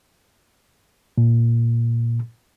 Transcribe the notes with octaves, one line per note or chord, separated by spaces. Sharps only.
A#2